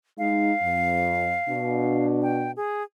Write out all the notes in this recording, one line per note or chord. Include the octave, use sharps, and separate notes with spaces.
G#3 D#4 F5
F2
B2 D4
G5
G#4